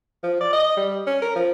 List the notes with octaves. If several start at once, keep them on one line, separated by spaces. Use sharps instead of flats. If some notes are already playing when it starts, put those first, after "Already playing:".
F3
D5
D#5
G3
C#4
A#4
F3